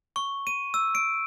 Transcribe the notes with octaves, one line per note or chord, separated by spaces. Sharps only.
C#6
D#7
E6
D7